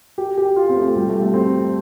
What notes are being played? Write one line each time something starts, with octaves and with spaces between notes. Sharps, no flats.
G4
G4
F4
C4
A3
G3
A3
A3
C4